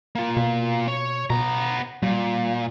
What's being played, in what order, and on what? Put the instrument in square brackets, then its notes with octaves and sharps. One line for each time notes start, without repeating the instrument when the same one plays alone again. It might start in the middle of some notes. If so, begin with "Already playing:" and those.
[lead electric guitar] A#3 F4
[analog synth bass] B2
[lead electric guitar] C#5
[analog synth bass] B2 [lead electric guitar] B3 A#5
[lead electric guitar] A#2 [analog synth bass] G3